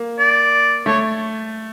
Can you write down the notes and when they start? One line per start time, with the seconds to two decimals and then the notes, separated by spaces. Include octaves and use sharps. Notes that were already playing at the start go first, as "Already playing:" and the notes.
Already playing: A#3
0.19 D5
0.86 A3 C#5